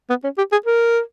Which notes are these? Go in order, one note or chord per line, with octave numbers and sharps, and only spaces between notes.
B3
C#4
G4
G#4
A#4